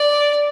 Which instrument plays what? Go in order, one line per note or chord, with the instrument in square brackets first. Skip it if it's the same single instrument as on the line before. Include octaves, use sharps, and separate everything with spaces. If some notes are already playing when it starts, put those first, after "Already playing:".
Already playing: [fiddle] D5